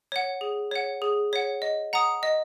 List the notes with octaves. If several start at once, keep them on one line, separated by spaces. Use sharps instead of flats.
C#5 F#5
G#4
C#5 F#5
G#4
C#5 F#5
D#5
F#5 A#5 D#6
D#5